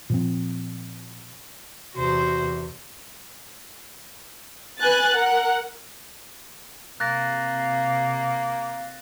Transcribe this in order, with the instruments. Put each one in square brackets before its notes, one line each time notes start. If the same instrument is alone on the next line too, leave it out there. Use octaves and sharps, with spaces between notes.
[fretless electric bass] A#2 F3 C4
[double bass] E2 C3 [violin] F#4 C5
[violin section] B4 G#5 F#6 A6
A#4 F#5
[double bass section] C3 [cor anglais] A#3 [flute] F5 [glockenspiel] F#6 A6 A#6